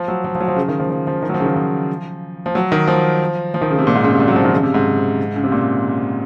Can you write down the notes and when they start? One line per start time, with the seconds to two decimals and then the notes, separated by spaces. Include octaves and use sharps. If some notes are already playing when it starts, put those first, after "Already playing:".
Already playing: F3
0.08 F#3
0.24 F3
0.35 F3
0.40 F#3
0.48 F3
0.56 C#3
0.68 D#3
0.80 F3
0.90 F3
1.07 F3
1.22 D#3
1.29 F#3
1.34 F3
1.40 C#3
1.45 D#3
1.56 F3
2.46 F3
2.55 F#3
2.72 D#3
2.88 F3
3.54 F3
3.61 D#3
3.70 C#3
3.78 C3
3.87 A#2
3.95 G#2
4.04 C#3
4.12 C3
4.20 A#2
4.28 F#3
4.36 F3
4.45 D#3
4.52 C#3
4.63 C3
4.74 G#2
5.36 C#3
5.44 C3
5.52 A#2